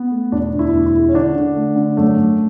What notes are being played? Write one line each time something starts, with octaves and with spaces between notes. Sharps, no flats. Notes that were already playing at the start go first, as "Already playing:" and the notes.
Already playing: B3
A3
E1 D4
D2
E4
E1
E4
G#3
C#4
D3 D4
D3
A3
D3
F#2 A3
F#2